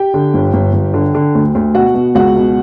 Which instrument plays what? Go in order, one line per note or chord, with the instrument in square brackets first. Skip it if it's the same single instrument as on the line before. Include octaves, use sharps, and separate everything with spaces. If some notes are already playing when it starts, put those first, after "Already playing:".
Already playing: [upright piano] G4 G5
D3
G1
G1
G1
D3
D3
D2
D2
B2 F#4 F#5
B2
C#2 F#4 F#5
B2